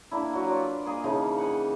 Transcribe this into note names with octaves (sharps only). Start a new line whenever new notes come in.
A#3 D4 E4
F#3 F#4
F4 B4 D5
A#3 G#4 D#5
C#3 E3 F3 D#4
F#5 G#5